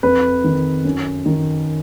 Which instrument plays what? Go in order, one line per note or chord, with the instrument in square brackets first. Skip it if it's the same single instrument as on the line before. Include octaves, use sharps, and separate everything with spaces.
[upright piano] F2 B4
D#3
F#2
D#3